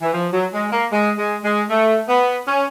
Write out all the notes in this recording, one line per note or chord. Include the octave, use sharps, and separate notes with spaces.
E3
F3
F#3
G#3
A#3
G#3
G#3
G#3
A3
B3
C#4